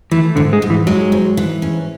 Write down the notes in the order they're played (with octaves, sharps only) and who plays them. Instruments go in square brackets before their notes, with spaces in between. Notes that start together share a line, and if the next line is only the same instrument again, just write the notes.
[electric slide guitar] E3 [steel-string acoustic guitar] A3
[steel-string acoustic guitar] G#2 [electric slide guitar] D3
[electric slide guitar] G#3
[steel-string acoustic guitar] G#2
[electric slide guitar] E3
[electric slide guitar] F#3 [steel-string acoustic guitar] G#3
[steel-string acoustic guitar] G#2
E3
C#4